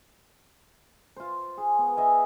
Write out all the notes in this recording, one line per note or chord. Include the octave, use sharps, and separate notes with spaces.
F4 C5
G#4
B3
D#5 E5 G#5